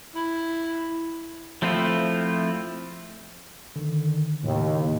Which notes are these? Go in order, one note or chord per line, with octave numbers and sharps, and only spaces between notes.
E4
F3 A3 C4 E4 F4
D3 D#3
D#2 A2 C#3